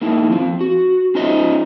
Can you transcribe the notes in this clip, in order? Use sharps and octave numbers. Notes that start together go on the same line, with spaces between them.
A#3 D#4 E4
F3 C4
F#4
C#4 D#4 F4 C5 D#5 E5